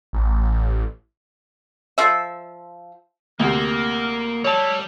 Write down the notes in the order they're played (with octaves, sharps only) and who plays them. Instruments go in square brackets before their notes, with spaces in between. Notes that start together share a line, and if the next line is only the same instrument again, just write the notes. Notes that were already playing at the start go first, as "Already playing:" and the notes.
[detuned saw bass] A1
[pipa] F3 E5
[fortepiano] D2 C3 [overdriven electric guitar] A#3 [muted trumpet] A#4
[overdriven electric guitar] G3 [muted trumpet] E4 [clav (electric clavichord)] C#5 A5